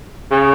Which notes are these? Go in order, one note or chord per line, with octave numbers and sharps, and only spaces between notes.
C#3